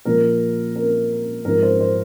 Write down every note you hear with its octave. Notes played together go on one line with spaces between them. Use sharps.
A#2 F3 A#4
A#4
G#2 F3 A#4
C5
C5